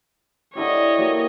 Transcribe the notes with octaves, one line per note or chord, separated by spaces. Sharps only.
D3 E4 G4 C#5 D#5
F#3 A#3 G4